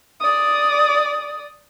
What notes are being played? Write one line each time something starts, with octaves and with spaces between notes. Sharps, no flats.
D5 D#6